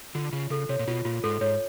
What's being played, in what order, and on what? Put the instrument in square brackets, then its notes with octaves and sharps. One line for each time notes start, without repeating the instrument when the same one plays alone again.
[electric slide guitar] D3 [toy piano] F4
[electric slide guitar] C#3 [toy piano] F4
[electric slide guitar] C#3 [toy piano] A4
[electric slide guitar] C3 [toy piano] C#5
[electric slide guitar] A#2
[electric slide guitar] B2 [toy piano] F4
[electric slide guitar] A#2 [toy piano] F4
[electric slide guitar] G#2 [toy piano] A4
[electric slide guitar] G#2 [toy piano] C#5